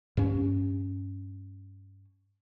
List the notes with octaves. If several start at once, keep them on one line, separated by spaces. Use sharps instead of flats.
G2 C#4